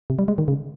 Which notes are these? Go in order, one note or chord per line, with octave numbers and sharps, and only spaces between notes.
C3
G3
G#3
D#3
C#3